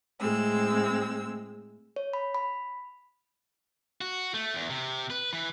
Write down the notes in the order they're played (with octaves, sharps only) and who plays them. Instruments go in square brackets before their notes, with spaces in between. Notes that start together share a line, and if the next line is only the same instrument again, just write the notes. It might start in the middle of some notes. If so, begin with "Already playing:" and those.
[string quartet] A2 G#3 C4 E6
[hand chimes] C#5
B5
B5
[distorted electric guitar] F#4
A3
E2
C3
B4
E3